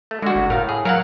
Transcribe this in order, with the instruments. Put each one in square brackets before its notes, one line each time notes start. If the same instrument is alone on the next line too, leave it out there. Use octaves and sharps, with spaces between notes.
[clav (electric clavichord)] A3
[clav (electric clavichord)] D3 F#4 [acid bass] G#3
[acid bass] F#1
[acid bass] A2 [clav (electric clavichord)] A#4 F5
[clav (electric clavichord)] G#4
[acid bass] F#3 [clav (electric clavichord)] A#4 F5 F#5